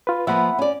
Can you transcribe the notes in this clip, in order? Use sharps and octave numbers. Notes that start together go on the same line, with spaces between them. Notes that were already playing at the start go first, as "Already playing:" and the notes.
F4 B4
F3 A#3 B3 E5 F#5 B5
C#4 D5